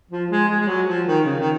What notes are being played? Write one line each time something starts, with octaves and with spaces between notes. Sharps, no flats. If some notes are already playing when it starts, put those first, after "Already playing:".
F3
G#3
G#3
G#3
F#3
F3
D#3
C#3
D#3